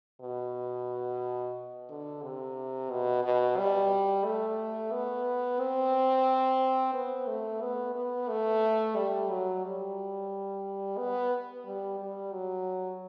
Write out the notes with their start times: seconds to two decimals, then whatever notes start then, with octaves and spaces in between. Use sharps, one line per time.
0.21 B2
1.89 D3
2.22 C3
2.90 B2
3.24 B2
3.58 G3
4.24 A3
4.92 B3
5.60 C4
6.94 B3
7.27 A3
7.61 B3
7.95 B3
8.29 A3
8.96 G3
9.30 F#3
9.64 G3
10.97 B3
11.65 G3
11.99 G3
12.33 F#3